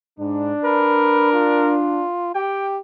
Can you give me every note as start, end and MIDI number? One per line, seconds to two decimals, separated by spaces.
0.19 0.53 44
0.19 2.03 62
0.65 1.76 70
0.65 1.31 71
1.33 2.31 65
2.35 2.78 67
2.35 2.67 79